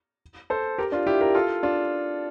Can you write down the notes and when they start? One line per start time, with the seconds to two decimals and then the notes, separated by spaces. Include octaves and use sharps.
0.50 A4 C5
0.78 G4 A#4
0.92 D4 F4
1.07 E4 G4
1.21 G4 A#4
1.35 F4 A4
1.63 D4 F4